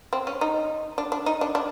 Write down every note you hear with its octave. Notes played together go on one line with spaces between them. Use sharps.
C4
C#4
D#4
D4
D4
D#4
D4
D4